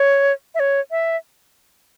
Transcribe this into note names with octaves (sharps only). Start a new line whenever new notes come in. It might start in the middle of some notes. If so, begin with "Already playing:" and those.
Already playing: C#5
E5
C#5
E5